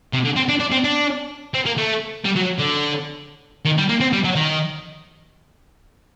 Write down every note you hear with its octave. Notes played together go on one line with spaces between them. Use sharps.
C3
D3
C4
D4
D4
C4
D4
C4
A#3
A3
G3
F#3
D3
D#3
G3
A#3
C4
G3
F#3
D#3